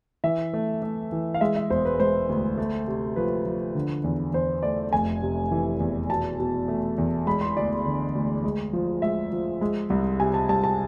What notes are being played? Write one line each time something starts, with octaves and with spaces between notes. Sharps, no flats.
E3 E5
A3
A3
E3
F5
G#3 E5
E5
E1 C5
B4
G#3 C5
D2
A3
C3
F3 B4
F3
D3
E2
E2 C5
A3 D5
F1 G#5
C3
E3
E2
B2 A5
B2
A3
E2
G#3 B5
C6
D2 D5
D3
D2
G#3
F3
G#3 E5
F3
G#3
C2
C3 G#5
A5
C2 A5
A5